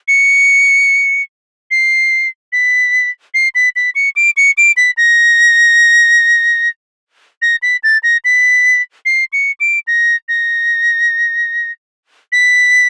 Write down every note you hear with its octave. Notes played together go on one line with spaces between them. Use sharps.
C#7
C7
B6
C7
B6
B6
C#7
D7
C#7
D7
B6
A#6
A#6
B6
A6
A#6
B6
C7
C#7
D7
A#6
A#6
B6